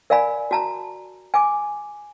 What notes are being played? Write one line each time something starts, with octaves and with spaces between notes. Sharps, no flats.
A#4 D5 F5 G#5 B5
F#4 A5 A#5
G#5 D6